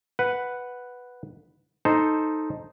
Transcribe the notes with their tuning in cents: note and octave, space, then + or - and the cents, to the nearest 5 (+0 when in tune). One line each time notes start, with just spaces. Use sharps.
B4 +0 F#5 +0
D#4 +0 A4 +0 C5 +0